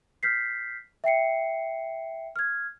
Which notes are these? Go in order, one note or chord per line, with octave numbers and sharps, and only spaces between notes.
F6 G6 B6 C7
E5 G5 C7 C#7
F6 G#6